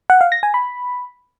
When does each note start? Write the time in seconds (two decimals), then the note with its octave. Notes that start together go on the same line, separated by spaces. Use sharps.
0.10 F#5
0.21 F5
0.32 A#6
0.43 G#5
0.54 B5